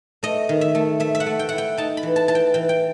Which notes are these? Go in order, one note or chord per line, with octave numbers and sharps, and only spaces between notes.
A3 D#5
D#3
E5
A3
A3 E5
E5
F#5
A3
G5
E4 F#5
G5
D#4 A5
B5
E3
A5
E3 A5
G5
E3 G5
G5